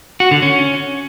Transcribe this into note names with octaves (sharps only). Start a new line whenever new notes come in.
F#4
D3
C#4